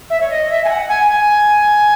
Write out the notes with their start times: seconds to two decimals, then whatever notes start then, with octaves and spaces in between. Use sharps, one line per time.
0.10 E5
0.20 C#5
0.30 D#5
0.50 E5
0.64 G#5
0.69 F#5
0.89 G#5
1.08 G#5